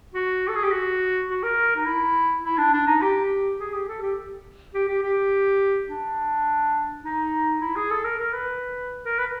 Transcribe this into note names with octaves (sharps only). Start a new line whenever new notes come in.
F#4
A4
G#4
G4
F#4
F#4
A#4
D#4
E4
E4
D4
D4
D#4
G4
G#4
G4
A4
G4
G4
G4
G4
D4
D#4
E4
G#4
A4
A#4
A#4
B4
A#4
B4